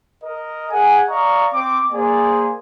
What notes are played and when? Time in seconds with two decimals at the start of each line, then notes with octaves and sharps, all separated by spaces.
0.23 A#4 D#5
0.70 G#4 F#5 G#5
1.09 D5 D#5 F5 A#5 C#6
1.54 C4 D6
1.93 A#3 G#4 C5 D5 G#5